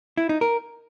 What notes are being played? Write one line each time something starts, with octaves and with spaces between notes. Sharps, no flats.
E4
D#4
A#4